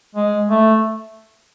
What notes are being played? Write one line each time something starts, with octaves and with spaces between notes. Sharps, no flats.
G#3
A3